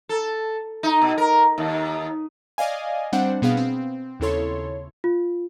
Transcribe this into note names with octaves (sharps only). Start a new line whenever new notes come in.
A4
D#4
B2
A#4
D#2
D5 D#5 F5 G#5
G3 C4 D4 C5 F#5
B2 B3 G#4 F5
C4
D#2 C#3 E4 A4 C#5 C6
F4